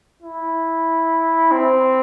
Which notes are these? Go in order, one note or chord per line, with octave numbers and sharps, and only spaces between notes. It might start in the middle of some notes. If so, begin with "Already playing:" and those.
E4
C4